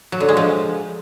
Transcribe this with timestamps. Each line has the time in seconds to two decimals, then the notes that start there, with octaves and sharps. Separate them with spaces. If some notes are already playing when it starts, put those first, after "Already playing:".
0.12 F#3
0.20 D3
0.29 G#3
0.37 F3